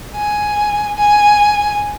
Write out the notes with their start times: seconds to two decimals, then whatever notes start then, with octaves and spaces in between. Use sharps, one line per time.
0.16 G#5
0.97 G#5